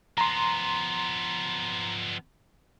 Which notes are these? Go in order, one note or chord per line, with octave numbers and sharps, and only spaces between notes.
F3 B3 A#5 C6